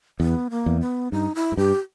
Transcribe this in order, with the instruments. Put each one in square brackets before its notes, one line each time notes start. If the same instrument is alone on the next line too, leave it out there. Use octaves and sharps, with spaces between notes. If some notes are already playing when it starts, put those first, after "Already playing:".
[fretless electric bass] E2 [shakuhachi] B3
[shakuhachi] A#3
[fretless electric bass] E2
[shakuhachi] B3
[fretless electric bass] G2 [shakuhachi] D#4
[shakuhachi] E4
[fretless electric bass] G#2
[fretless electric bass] G2 [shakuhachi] G4